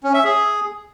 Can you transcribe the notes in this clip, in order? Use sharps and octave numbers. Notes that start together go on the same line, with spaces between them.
C#4
E5
G#4